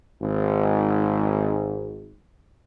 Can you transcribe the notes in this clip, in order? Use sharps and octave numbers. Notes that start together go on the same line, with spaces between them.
G#1 G#2